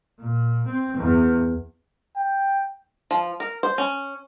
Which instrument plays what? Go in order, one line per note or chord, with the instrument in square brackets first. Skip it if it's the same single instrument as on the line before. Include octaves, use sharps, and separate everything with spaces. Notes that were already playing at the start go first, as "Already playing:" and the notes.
[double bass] A#2
C4
E2
[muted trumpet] G5
[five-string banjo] F3
A#4
C5
C#4